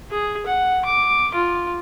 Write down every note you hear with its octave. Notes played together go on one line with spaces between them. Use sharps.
G#4
F#5
D6
F4